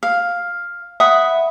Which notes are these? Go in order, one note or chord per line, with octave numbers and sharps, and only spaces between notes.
F5
E5 F#5 B5 D#6